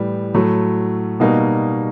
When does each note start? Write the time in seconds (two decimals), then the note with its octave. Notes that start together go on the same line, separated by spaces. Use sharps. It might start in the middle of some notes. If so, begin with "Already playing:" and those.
Already playing: A2 E3 G3
0.34 A2 F#3 A3
1.20 B2 G3 A#3 D#4 F#4